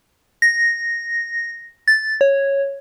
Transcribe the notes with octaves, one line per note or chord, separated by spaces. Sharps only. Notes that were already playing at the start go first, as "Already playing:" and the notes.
A#6
A6
C#5